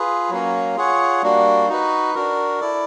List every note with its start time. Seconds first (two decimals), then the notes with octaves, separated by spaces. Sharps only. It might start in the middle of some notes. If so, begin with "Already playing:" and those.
Already playing: F4 G#4 B4
0.30 F#3 A#3 C#4
0.76 F4 G#4 C#5 F#5
1.23 G3 A#3 D4 F#4
1.68 D#4 F#4 B4
2.15 D4 F#4 A#4
2.61 E4 A4 D5